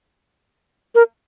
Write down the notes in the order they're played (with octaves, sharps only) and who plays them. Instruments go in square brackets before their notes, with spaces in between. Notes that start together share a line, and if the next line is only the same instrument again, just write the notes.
[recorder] A#4